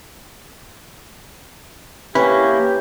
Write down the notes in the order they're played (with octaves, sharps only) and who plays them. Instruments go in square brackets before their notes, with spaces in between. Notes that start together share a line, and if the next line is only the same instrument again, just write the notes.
[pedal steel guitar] A#3 E4 [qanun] C#4 [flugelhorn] G4 [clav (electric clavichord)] B4